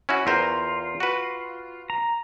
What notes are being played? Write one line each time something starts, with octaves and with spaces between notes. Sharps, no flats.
C#4 E4 F#4
E2 F4 A#4 C5
F#4 B4
A#5